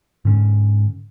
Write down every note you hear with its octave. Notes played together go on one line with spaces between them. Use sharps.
G#2 D3 C#4